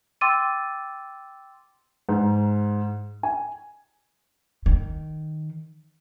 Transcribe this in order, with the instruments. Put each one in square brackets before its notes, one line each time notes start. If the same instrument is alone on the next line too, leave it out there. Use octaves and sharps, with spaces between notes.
[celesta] G5 C6 D6 E6 A6 D#7
[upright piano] G#2
G#5
[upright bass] D#3